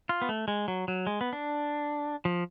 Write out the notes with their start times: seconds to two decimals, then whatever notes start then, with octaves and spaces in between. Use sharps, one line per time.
0.09 F4
0.22 B3
0.29 A3
0.48 G#3
0.68 F#3
0.88 F#3
1.07 G#3
1.21 B3
1.33 D4
2.25 F3